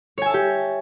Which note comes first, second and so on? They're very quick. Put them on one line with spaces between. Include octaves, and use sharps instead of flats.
C#5 G#5 E5 A5 G4